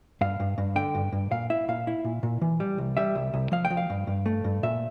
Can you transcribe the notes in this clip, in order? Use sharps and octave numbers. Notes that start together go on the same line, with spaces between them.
G2 F5
G2
G2
D3 G5
G2
G2
A#2 F5
E4 E5
A#2 F5
E4
A#2
A#2
E3
G3
C2
G3 E5
C2
C2
F3 F5
G5
F3
F5
G2
G2
A3
G2
A#2 E5